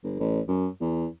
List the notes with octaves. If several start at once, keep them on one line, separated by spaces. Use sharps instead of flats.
G1
A1
F#2
E2